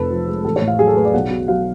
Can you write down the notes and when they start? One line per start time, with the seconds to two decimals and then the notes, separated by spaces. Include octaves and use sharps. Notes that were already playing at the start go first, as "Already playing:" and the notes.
Already playing: F1 F2 A4 B4
0.10 F3
0.28 G#3
0.45 A1 A4
0.56 C#5
0.62 A2
0.68 F5
0.79 F#3 G#4
0.88 A4
0.96 A3 B4
1.05 D5
1.14 B1 F#5
1.31 B2
1.48 F#3 F5